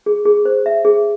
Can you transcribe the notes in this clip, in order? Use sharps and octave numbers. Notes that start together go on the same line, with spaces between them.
G#4
G#4
C5
E5
G#4